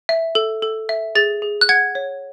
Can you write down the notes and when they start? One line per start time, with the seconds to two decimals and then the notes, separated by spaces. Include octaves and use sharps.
0.09 E5
0.35 A4
0.62 A4
0.89 E5
1.15 G#4 A6
1.42 G#4
1.61 F#6
1.69 F#5 G#6
1.95 C#5